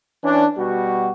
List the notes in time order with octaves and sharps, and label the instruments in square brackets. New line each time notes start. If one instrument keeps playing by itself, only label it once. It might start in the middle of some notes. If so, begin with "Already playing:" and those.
[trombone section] E3 C#4 D4
B2 G3 F#4